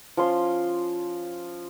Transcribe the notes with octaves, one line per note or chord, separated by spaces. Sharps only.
F3 C#4 C6